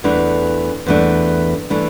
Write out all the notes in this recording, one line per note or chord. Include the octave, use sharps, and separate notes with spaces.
E2 E3 A3 D4
E2 E3 A3 D4
E3 A3 D4